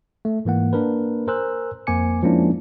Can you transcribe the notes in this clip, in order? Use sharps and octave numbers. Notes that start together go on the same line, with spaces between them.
A3
G#2 E3 A#3 F#5
A#3 D4 A#4 B4
A#4 C5 G#5 E6 F#6
F2 A#3 C5 G#5 D6 C#7
F3 G#3 A#3 C#4 D4 E4